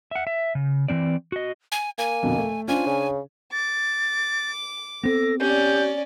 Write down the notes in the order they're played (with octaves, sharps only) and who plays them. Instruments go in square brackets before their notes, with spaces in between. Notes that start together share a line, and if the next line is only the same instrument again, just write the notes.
[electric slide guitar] E5 F#5
E5
C#3
E3 F3 C4 D5
F#4 D#5
[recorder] G#5
[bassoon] A#3 [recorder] G#5
[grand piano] F2 B2 D3
A3
[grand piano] C#4 D4 C5 [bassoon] F4 [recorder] G#5
[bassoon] C#3
[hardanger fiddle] D6 [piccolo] A6
[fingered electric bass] B3 C4 [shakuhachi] A4 [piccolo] A#6
[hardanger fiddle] C#4 D5 [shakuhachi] G4 [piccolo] G6